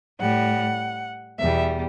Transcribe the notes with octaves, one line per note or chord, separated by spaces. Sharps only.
A2 G3 F#5
E2 B2 G3 E5